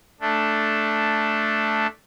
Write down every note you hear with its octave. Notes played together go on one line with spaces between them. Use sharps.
A3 D4